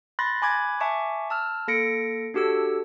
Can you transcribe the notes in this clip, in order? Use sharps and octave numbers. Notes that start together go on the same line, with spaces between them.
B5 C6 F#6 A6 A#6
G#5 B5 D6 F#6 G#6
E5 G#5 A5 C#6 D6
A5 E6 F6
A#3 A4 A#6 C#7 D7
D4 F#4 G4 A4 E6